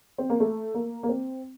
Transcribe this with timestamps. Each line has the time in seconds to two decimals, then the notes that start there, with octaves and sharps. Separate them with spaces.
0.18 C4
0.30 A#3
0.40 A3
0.74 A#3
1.03 A#3
1.09 C4